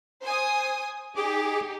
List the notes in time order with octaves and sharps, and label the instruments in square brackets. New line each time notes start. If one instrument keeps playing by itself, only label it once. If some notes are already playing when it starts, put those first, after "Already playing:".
[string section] C5 G#5 D#6
[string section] D#4 G4 [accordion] G#4 D6